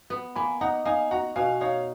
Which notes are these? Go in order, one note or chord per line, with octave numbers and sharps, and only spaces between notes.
B3
A#3 G#5 B5
D#4 F#5 A#5
D#4 F5 G#5
F#4 F#5 A#5
B2 F5 G#5
D#4 C#5 F5